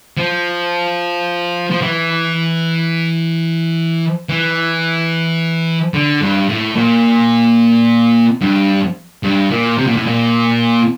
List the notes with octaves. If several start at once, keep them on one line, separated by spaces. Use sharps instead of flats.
F3
F3
E3
E3
D3
G2
A2
A#2
G2
G2
A#2
C3
A#2
A2
A#2